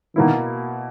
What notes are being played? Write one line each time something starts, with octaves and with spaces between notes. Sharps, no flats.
B2 D#3 A#3 E4